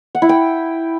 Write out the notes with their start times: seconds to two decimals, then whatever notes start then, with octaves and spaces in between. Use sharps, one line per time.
0.15 F#5
0.22 E4
0.29 G5